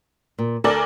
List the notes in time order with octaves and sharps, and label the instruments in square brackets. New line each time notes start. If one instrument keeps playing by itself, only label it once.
[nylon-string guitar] A#2
[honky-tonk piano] D2 A#4 D5 [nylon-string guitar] A4